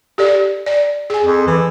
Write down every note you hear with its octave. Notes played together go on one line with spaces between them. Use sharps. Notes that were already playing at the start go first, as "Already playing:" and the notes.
G4 A4 D5
D5
G#4 G#5
F2
E3